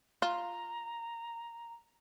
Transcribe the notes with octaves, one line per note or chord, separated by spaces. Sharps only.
F4 A#5